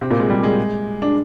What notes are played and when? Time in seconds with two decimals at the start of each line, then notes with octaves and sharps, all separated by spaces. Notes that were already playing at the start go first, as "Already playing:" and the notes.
0.01 C3 C4
0.11 A#2 A#3
0.20 G#3
0.30 G3
0.43 G#3
1.02 D4